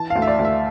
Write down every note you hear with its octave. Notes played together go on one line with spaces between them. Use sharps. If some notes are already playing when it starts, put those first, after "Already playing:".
Already playing: E3 A5
F5
D2
E5
D5
D2
E5